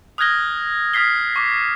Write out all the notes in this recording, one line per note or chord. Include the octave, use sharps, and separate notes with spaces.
D#6 F6 F#6 G#6 A#6 G7
D#6 F6 G#6 B6 C7 G7
C#6 D6